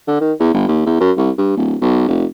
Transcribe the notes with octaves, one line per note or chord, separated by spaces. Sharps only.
D3
D#3
E2
G1
D#2
E2
F#2
C2
G2
D1
B1
F1